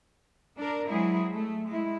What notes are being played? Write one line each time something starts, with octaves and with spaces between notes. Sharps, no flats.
D4 A#4
F#3 G#3 C4 E4 G#4
A3
G#3 E4